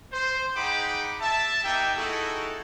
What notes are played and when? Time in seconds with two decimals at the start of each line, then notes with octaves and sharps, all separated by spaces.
0.12 C5
0.55 D#4 G#4 F#5 G5 B5 D6
1.20 E5 A5
1.63 A#3 D#4 G4 E5 G5
1.96 D#4 E4 F#4 G#4 A4